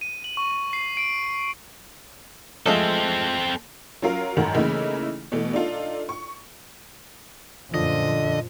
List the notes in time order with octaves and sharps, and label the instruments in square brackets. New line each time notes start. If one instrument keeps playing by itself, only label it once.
[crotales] D#7
F#7
C#6
C7
D7
[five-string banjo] F3 G#3 A3 [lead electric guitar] C4 A4
[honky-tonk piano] F#3 C#4 F4 A#4 F5
G#1 F#2 D#3 F#4 A4 A#5
C#3 E3 A3 A#3 D#4 E4
B2 E3 A3
D4 D#4 F4 A4
C#6
[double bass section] F#2 A#2 F3 [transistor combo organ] D3 [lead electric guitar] D#5